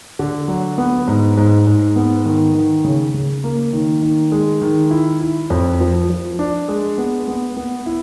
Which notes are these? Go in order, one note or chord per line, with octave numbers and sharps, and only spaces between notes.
D3
F#3
B3
G#2
G#2
G#2
B3
D#3
D#3
C#3
C#3
A#3
D#3
D#3
G#3
D#3
E4
E4
F2
F3
F3
D4
G#3
B3
B3
B3
E4